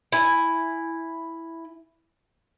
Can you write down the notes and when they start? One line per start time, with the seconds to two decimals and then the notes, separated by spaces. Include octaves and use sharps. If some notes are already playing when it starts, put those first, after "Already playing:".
0.12 E4 G#5